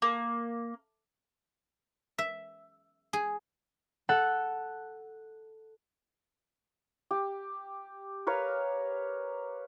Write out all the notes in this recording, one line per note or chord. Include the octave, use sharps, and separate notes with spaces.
A#3
E5
G#4
A4 F#5
G4
A#4 B4 C#5 F5